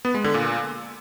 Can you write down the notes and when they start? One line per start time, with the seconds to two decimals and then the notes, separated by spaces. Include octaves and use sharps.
0.05 B3
0.14 G#3
0.24 D3
0.34 A#2